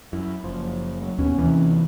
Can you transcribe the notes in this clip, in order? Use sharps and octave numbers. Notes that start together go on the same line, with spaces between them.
F#2 E4
F#1 F3
F#3
D#2 B2 C#4
D#2 C3 E3